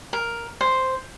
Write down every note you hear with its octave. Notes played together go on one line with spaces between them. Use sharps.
A#4
C5